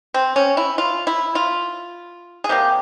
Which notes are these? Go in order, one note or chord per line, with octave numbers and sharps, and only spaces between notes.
C4
C#4
E4
F4
E4
F4
G#4
C3 G3 A#3 G4